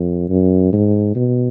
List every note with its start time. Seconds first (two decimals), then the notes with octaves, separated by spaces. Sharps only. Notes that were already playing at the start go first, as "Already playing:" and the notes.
Already playing: F2
0.29 F#2
0.73 G#2
1.16 B2